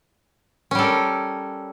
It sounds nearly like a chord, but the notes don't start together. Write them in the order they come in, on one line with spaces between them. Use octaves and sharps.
C#4 G3 A4 A#4